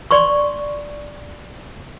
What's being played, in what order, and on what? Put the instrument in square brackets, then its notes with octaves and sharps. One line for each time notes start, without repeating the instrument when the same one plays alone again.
[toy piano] D5 C6 C#6